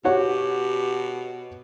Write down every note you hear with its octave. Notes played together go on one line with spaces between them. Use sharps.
B2 F#4 G4 C#5 F#5